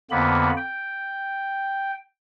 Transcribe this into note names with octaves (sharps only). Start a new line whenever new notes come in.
F2 D3 A#3 B3 B5
G5